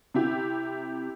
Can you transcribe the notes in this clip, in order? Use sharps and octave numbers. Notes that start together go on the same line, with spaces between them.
C3 E4 G4